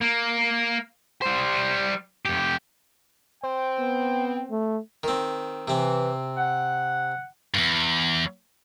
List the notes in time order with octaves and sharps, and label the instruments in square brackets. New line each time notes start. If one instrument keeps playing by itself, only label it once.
[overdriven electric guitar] A#3
G3 C5
F2 G4
[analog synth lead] C4 [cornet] G5
[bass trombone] B3
A3
[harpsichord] D#3 C4
[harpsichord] C3 C4 [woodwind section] E3
[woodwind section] F#5
[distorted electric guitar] E2 G2